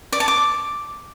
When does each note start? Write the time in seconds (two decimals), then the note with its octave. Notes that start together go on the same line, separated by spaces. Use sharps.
0.13 D5
0.20 A5
0.28 D6